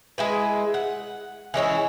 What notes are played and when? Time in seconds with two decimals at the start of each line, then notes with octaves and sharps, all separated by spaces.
0.18 G#3 E4 B4
0.74 F#5
1.54 E3 G#3 C#4 E4